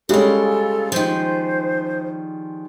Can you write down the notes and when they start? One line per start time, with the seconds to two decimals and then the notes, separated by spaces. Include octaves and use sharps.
0.09 C#3 G3 G#3 C#4 F4 A4
0.92 D#3 F3 C5